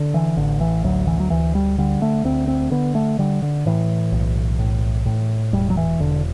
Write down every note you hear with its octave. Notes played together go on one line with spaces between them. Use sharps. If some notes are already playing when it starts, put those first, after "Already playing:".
Already playing: D3
E3
A1 D3
E3
D2 F#3
E3
F#3
D2 E3
G3
D3 G3
A3
D2 C4
C4
D3 B3
A3
D3 G3
D3
A2 E3
B1
A2
A2
E1 G3
F#3
E3
E1 D3